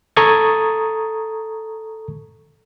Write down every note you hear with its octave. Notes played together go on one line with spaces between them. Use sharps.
A4 A#5 C#6 D#6 G#6 A6